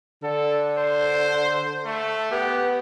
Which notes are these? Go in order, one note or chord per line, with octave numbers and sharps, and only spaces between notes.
D3 A4
C5
A3
B3 G4